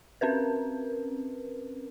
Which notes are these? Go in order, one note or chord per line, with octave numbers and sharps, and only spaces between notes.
C4 C#4 A#4 B4